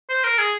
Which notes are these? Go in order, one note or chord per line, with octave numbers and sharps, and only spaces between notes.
C5
A#4
G#4